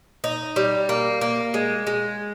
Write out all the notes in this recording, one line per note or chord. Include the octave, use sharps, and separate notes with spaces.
D#4
G3
A#3
A#3
G#3
G#3